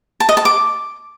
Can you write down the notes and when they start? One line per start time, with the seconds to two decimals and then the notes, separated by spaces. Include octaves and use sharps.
0.20 A5
0.29 D#5
0.37 A5
0.45 D6